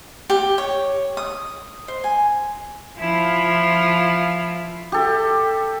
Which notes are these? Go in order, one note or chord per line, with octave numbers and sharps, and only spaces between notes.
G4
C#5
D#6
C5
G#5
F3 E4 F4
G4 A4